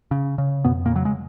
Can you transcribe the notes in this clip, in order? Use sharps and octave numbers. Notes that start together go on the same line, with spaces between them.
C#3
C#3
F2 B2 B3
A#2 A#3
C#3 F#3
G#3